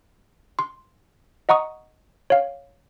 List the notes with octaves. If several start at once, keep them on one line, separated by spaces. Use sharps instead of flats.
C6
D#5 F#5 A#5 C#6 D#6
C#5 F5